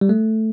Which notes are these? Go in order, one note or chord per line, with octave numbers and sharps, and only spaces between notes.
G3
A3